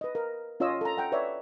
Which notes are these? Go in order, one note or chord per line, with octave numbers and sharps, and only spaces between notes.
B4 D#5
A#4
C#4 F4 C#5 D#5 E6
A4 A#5
F#5 G5 A#5
B4 C#5 D5 E5